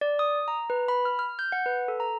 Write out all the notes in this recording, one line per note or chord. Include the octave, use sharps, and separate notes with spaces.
D5
D#6
A#5
B4
B5
F6
F6
G6
F#5
B4
A4
A#5